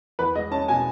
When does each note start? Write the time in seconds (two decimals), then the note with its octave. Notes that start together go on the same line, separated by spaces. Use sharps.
0.19 E2 B4
0.35 G#3 D#5
0.51 C#4 A5
0.68 B2 G#5